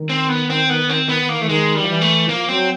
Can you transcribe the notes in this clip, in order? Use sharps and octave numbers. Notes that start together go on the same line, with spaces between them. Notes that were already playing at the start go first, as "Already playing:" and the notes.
Already playing: D#3
C4
B3
C4
B3
C4
B3
A#3
E3 A3
D#3 G#3
G3
F3
E3
A3
F3 A#3
F#3 C4